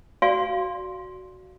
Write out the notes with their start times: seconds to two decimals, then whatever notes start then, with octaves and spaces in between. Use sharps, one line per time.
0.22 F#4 D5 F5 G#5 C6